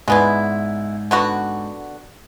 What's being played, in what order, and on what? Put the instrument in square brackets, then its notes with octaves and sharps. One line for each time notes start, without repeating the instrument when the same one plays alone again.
[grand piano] G#2 D5 G#5 [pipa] G#3 B3 E4
[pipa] D3 B3 F#4